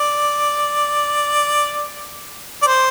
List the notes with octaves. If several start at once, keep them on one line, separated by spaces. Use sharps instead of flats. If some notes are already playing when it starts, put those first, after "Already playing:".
Already playing: D5
D5
C5